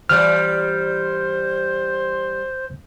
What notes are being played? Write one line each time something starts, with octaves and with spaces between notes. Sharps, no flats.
E3 G3 C5 D5 F6